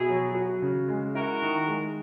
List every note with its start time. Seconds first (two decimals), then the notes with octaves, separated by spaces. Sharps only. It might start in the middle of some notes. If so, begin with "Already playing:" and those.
Already playing: B2 E4 G#4
0.09 F#3
0.35 F#4
0.62 C#3
0.88 G#3
1.14 E4 F#4 A#4
1.42 D#3
1.68 G#3